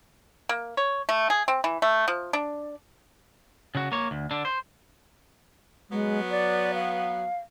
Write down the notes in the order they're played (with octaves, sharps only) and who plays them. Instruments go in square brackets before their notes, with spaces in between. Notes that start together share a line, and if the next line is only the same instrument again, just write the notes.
[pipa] A#3
C#5
A3
G#4
C4
E3
A3
F3
D4
[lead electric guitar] C#3 F#4
A#3 C#5
D2
D3 D4
C5
[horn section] F#3 B3 [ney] G#3
[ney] D5
F5